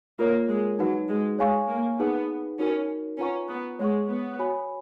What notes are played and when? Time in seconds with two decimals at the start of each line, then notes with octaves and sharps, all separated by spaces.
0.19 A#3 F4 A#4 C#5
0.49 G#3
0.79 F#3 D#4 F#4 B4 F#5
1.09 G#3
1.39 G#3 C#5 F5 G#5 C#6
1.69 A#3
2.00 B3 D#4 G#4 B4 F#5
2.59 C#4 D#4 F#4 A#4
3.19 C#4 F4 B4 F#5 A#5 C#6
3.49 B3
3.79 G#3 C#5 F#5 C#6
4.10 B3
4.39 F#4 C#5 G#5 B5